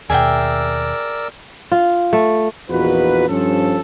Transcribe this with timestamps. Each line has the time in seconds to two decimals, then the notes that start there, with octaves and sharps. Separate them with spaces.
0.10 D#2 B2 G#4 A#4 D5 E5 G5 E6
1.72 F4
2.13 A3
2.69 A#1 E2 D#4 F4 F#4 B4
3.28 G2 F3 C#4 A4